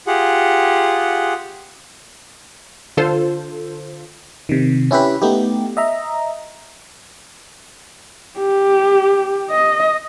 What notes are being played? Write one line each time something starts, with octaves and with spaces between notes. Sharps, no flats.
F4 G4 G#4 F#5
D3 F4 A4 C5
C3 D#3
C#4 E4 G4 B4 B5
A3 B3 D#4 G4
D#5 E5 A#5
G4
D#5